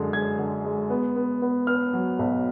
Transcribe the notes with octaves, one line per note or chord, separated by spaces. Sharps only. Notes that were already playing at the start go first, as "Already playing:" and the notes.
Already playing: F#2 D3 G#3
G#3 G#6
D3
G#3
B3
B3
B3
B3 F6
F#3
B1